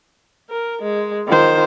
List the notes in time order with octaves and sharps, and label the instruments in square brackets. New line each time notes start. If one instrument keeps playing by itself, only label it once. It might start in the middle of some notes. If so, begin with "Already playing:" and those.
[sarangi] A#4
G#3
[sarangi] D#3 [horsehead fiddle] F4 C5